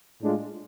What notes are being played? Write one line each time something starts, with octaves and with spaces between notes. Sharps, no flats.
A2 G#3 D4 F4